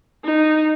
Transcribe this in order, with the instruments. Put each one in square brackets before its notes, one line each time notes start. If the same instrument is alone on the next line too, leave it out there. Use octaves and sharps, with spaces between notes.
[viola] D#4